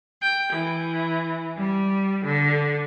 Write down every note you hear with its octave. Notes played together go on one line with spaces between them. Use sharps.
G5
E3
G3
D3